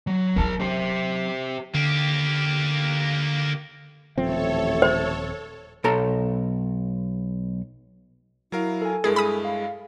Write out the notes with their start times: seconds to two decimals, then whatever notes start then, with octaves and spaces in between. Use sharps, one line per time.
0.07 F#3
0.36 F#3 D#4 A#4 A5
0.60 G4 C5
1.75 D3 A#3 G4
4.18 D#1 A1 C3 F3 C4 A4 C#5 E5
4.82 C5
5.84 B1 A4 A#5
8.52 F#3 E4 A#4 F5
8.82 A4 G#5
9.04 G2 G#3 E4 G#4 A#4
9.16 G#4 B5 D#6
9.45 F5